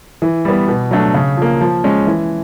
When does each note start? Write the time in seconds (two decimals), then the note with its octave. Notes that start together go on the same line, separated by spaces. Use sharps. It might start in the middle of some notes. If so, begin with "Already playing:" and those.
0.22 E3
0.45 G3 B3
0.68 B2
0.91 F#3 A3 D4
1.14 C#3
1.37 F3 A#3
1.61 F3
1.84 G#3 C#4
2.07 E3